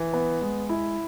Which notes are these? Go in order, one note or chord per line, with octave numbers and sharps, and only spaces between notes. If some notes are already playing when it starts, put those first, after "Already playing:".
Already playing: E3
B3
G#3
E4